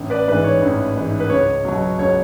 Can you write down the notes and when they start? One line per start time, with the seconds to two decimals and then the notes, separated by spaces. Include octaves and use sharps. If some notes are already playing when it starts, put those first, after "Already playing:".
Already playing: A1
0.10 B4 D5
0.28 G#2 B4
0.32 E3
0.44 C#5
0.62 A1
0.96 G#2 E3
1.20 B4
1.30 C#2 C#5
1.65 B2 F#3
1.98 C#2 C#5